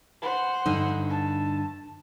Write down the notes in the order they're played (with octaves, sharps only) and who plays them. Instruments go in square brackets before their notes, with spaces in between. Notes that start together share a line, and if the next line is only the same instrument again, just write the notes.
[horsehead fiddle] C5 F#5
[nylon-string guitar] G2 D3 D#4
[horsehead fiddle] A5